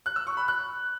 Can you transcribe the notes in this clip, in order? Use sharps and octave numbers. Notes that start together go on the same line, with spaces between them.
F#6
E6
C#6
B5
F#6